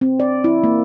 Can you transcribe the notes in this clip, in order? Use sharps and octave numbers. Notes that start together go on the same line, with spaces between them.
C4
D5
E4
A#3